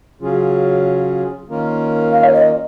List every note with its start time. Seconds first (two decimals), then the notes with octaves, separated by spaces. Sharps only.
0.20 C#3 F#3 C#4 F4 G#4
1.48 D#3 A#3 C#4 F4 A#4
2.13 F5
2.24 C#5
2.34 D#5